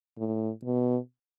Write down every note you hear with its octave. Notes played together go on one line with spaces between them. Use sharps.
A2
B2